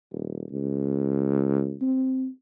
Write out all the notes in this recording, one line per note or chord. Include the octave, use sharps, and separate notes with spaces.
D#1
C#2
C4